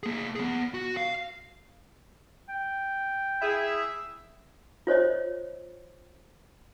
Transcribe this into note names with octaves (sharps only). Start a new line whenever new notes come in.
A#3 G#4
B3 G#4
F#4
F5
G5
E4 G#4 E5
F4 C5 C#5 D#5